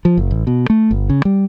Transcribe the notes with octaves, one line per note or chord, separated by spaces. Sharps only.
F3
F#1
A1
B2
A3
G1
C#3
G3